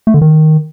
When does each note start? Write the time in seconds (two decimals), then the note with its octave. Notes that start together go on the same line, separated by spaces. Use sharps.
0.07 A3
0.14 D3
0.21 D#3